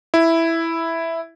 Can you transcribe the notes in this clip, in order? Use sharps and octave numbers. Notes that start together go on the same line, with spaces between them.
E4